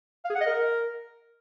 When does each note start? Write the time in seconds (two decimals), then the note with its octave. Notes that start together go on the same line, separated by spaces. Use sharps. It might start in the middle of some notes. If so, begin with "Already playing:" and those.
0.24 F5
0.30 G#4
0.35 F#5
0.40 D#5
0.46 A#4